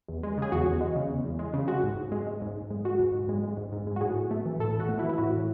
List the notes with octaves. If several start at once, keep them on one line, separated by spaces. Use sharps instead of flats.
E2
G#3
C#3 G#4
E2 F#4
E2
G#3
C#3
E2
E2
G#3
C#3
G#3 F#4
G#2
G#2
G#3
G#3
G#2
G#2
G#3
G#3 F#4
G#2
G#2
G#3
G#3
G#2
G#2
G#3
F#4
A2 G#4
A2
A3
E3
A2 A4
A2
F#4
A3
E4
E3
E4
A2 F#4
A2